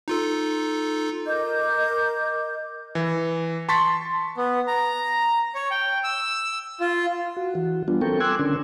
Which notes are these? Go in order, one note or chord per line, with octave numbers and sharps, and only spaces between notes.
D#4 F4 A4
A#4 D#5 D6 G6
E3
A5 C6 C#6 A6 B6
B3
A#5
C#5
G5
E6
F4
F#4
E3 F#4
G3 B3 D4 F4
C4 A4 A#4 G5 C#6
G#5 C6 D6 E6 F#6 G#6
D3 C#4 D4 A#4